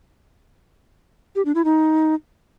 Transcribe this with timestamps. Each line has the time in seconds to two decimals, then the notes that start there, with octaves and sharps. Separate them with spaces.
1.36 G4
1.45 D4
1.55 E4
1.65 D#4